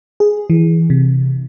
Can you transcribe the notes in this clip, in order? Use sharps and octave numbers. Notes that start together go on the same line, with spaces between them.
G#4
E3
C3